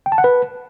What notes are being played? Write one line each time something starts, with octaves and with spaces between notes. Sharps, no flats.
G5
A5
F#5
B4